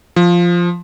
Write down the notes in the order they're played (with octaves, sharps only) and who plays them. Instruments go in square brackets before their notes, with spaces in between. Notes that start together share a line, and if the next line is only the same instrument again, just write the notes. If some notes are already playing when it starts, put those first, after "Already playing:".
[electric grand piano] F3